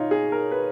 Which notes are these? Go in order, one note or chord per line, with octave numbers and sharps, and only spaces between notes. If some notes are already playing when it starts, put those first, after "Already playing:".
Already playing: B2 D#4 F4 C#5
G#4
A#4
B4